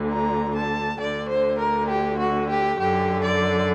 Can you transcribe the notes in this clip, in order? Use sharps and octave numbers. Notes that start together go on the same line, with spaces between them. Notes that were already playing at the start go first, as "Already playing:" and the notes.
Already playing: D2 D3
A#5
A5
D2 D3 D5
C5
A#4
G4
F#4
G4
F#2 D3 G4
D5